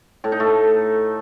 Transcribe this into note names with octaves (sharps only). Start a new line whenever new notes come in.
A2
D#4
A3